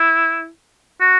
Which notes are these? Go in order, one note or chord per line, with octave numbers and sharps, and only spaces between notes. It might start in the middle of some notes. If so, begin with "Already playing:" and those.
Already playing: E4
F#4